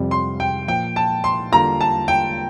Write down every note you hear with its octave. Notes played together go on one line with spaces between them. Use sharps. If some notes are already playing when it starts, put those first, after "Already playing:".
Already playing: F2 C3 G3
C6
G5
A#2 F3 A#3 G5
A5
C6
E2 D3 G3 A#3 F4 A#5
A5
G5